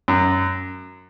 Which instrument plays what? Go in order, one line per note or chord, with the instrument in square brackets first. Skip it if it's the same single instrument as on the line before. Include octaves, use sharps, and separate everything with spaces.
[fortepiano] F#2